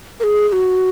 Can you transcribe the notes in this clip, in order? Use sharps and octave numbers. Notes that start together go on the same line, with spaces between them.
A#4
G#4
G#4
F#4